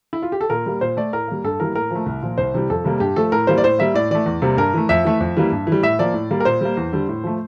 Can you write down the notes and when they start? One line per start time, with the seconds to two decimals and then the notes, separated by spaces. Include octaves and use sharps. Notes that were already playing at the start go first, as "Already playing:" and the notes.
0.13 E4
0.22 F4
0.32 G4
0.41 A4
0.50 A#2 A#4
0.66 G3 A#3
0.81 A#2 C5
0.97 A3 D5
1.13 A2 A#4
1.28 G3 A#3
1.44 G2 A4
1.60 E3 G3 A#3 A#4
1.75 A2 A#4
1.91 F3 A3
2.06 C2
2.22 A#2 F3
2.38 C2 C5
2.54 C3 E3 G3
2.70 F2 A4
2.85 C3 G3 A#3
3.00 G2 G4
3.16 F3 A3 A4
3.32 A2 A#4
3.47 E3 G3 A#3 C5
3.58 D5
3.64 A2 C5
3.79 G3 A#3 E5
3.94 A2 D5
4.10 E3 A3 D5
4.26 E2
4.42 C3 G3 A#3
4.57 G2 A#4
4.74 E3 A3
4.89 F2 E5
5.05 E3 A3
5.21 F2
5.37 E3 G3 A#3
5.52 G2
5.67 E3
5.72 G3
5.82 A2 E5
5.99 F3 A#3 D5
6.14 A2
6.31 G3 A#3
6.40 A#4
6.45 A#2 C5
6.61 G3 A#3
6.77 E2
6.93 D3 G3
7.08 A2
7.24 F3 A3